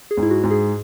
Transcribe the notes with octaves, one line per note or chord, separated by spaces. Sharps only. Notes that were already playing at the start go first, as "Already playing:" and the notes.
G#4
G#2
E4
F#4
G#2
G#4